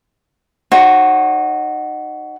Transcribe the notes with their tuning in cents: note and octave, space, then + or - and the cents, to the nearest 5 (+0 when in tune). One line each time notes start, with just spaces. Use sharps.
D#4 -25 F#4 +10 C#5 -45